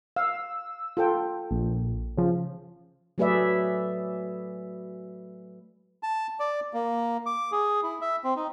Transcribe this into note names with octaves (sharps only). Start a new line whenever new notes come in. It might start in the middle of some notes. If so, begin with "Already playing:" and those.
F5 E6
F4 A4 G5
A#1
C#3 F3
F#3 A3 G#4 B4 D5 E5
A5
D5
A#3
D6
G#4
E4
E5
C4
D#4